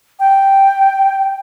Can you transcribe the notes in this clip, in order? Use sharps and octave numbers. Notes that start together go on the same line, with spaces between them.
G5